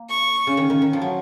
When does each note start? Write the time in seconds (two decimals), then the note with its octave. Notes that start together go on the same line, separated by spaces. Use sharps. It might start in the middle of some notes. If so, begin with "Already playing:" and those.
Already playing: A#3
0.09 C#6
0.47 C#3
0.57 D#3
0.70 D#3
0.82 D#3
0.93 F3
1.02 F#3